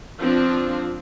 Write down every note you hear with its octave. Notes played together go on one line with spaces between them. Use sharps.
F3 C4 D4 F4